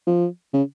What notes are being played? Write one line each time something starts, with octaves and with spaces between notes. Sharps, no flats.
F3
C#3